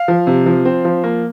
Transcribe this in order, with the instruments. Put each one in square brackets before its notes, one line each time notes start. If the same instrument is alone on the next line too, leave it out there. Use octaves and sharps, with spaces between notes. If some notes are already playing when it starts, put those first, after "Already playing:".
Already playing: [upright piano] F5
F3
C3
F3
C4
F3
A#3